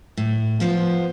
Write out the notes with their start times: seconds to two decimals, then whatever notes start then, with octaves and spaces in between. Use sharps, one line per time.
0.17 A2
0.60 F3 B3 F4 C5